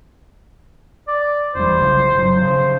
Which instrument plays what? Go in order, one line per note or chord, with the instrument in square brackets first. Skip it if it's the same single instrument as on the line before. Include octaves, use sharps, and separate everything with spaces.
[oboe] D5
[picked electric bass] F1 E2 G3 [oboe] C5
[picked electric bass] B1 C#3
G1 F#3
[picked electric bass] C#3 F3 [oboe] C5